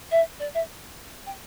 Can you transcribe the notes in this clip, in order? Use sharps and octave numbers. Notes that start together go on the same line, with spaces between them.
E5
D5
E5
G5